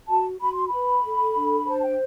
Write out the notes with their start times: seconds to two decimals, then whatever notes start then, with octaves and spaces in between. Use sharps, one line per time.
0.08 F#4 A5
0.40 F#4 B5
0.54 C6
0.68 B4 B5
1.04 A4
1.35 D4
1.67 C5 A5
1.84 G5